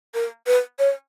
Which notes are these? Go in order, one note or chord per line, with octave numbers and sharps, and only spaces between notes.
A#4
B4
C#5